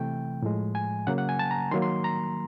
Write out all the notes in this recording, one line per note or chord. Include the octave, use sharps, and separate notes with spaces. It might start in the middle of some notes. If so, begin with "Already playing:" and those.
Already playing: C3 E3 A3 G5
A2 F3 G#3
G#5
C#3 F#3 A#3 F#5
F#5
G#5
A5
A#5
D#3 F#3 A#3 C6
C6
A#5